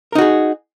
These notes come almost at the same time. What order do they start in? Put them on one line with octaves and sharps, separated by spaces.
A#4 D#4 F#4 G#4